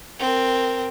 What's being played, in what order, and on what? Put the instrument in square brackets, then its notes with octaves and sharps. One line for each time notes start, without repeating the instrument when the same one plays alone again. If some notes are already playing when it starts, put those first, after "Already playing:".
[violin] C4 A#4